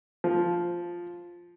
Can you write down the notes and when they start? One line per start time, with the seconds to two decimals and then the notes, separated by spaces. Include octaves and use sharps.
0.24 F3